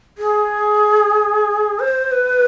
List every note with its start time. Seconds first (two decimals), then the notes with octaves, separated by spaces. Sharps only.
0.18 G#4
1.80 C5
2.11 B4